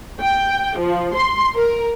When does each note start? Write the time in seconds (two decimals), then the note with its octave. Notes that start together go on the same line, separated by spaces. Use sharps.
0.22 G5
0.79 F3
1.16 C6
1.56 A#4